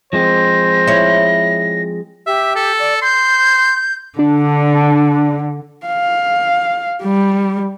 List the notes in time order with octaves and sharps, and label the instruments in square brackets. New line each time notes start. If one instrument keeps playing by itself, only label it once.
[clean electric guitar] F3 G#3 C4 [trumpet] C5 [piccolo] A#6
[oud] E4 C#5
[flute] G4 [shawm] E5
[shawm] A4
[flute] D5
[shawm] C6 [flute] G6
[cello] D3 [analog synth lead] D4
[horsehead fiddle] F5
G3